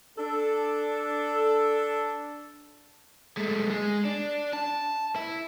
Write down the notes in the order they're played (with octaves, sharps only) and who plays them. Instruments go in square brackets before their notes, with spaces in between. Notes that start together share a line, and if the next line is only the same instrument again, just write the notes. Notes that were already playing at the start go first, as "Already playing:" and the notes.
[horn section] D4 A4
[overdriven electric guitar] G#3 A3
G#3
D4
A5
E4